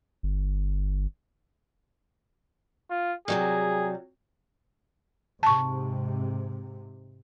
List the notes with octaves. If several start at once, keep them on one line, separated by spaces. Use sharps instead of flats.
G1
F4
C3 F#3 G3 G#4
G#2 C3 A5 C#6